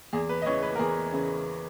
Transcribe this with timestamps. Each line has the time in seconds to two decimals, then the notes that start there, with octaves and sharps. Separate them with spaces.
0.13 E2 G#4
0.29 B4
0.42 D#5
0.46 C#3 E3 C#5
0.62 B4
0.75 A#4
0.79 E2 G#4
1.12 C#3 E3